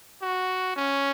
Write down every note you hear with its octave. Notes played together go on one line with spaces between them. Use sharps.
F#4
C#4